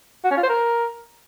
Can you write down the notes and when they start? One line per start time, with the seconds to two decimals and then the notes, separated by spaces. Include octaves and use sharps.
0.25 F#4
0.31 C#4
0.37 F4
0.43 C5
0.49 A#4